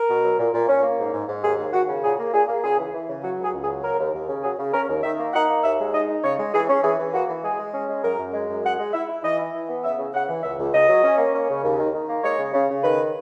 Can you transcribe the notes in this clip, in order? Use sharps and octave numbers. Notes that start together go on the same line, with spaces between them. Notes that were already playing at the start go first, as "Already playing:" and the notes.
Already playing: A#4
B2
F#3
A#2
A#2
C#4
A#3
G#2
G#2
G#2
D#2 G#4
D#2
D#2 F#4
C#3
A#2 G#4
A#3
A#2 G#4
A#3
C#2 G#4
E3
E3
C#3
F#3 F#4
C#2 G#4
C#2
G#4
F#3
C#3 A#4
D#2
D#2
C#3
F#3 G#4
C#3
C#4 A#4
D#2
D#3 E5
A#3
D#4 F#5
A#3
D#2 E5
G#3
D#4 D#5
D#4
C#3 C#5
G#3
E3 G#4
C#4
E3 G#4
E3
A#3 F#4
E3
G#3 G#4
G#3
C#4
G#3
F#2 A#4
F#2
G#3
F#2
G#3 F#5
G#3
E4 E5
E4
E3 D#5
E4
E3
B3
C#3 E5
C#3
C#3 F#5
E3
C#2 E5
C#2
C#2 D#5
F#3
C#4
A#3
C#4
C#3
D#2
D#3
D#3
A#3
G#3 C#5
C#3
C#3
C#3
D#3 B4